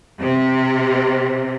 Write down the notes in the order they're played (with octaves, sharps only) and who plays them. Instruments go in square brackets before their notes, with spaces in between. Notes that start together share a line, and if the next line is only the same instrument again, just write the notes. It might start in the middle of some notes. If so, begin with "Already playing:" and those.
[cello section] C3